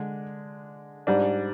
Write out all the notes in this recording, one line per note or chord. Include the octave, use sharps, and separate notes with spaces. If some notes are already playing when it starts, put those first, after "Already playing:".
Already playing: D3 G#3 D4
G#2 G3 D4